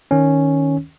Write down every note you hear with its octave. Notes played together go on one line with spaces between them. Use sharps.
D#3 C#4